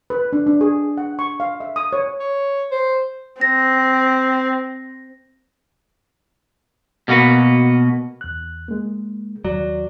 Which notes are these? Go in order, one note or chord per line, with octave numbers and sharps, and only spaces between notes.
B4
D4
D4
G#4
F#5
C#6
F5
E5
D#6
C#5
C#5
C5
C4 A#6
B2 A#3 F#4 B4
E2 F#6
G#3 A#3
D#2 F#3 D5